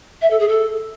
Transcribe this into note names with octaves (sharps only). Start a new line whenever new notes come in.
E5
A4
G#4
A4